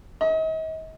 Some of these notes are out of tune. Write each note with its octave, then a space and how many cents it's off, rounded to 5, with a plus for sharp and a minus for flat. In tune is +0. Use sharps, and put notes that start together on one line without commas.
D#5 +40